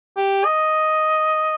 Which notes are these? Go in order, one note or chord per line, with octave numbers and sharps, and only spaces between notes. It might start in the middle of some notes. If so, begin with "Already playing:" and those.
G4
D#5